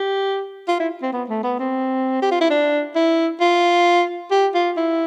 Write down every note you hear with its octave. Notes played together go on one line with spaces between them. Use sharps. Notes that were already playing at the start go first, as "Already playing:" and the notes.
Already playing: G4
F4
E4
C4
B3
A3
B3
C4
G4
F4
E4
D4
E4
F4
G4
F4
E4